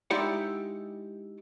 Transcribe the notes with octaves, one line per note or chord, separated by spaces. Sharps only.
G#3 D#4 E4 G4 D5 F#5